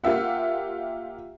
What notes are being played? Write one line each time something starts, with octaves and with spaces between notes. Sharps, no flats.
A#3 F4 G4 E5 F#5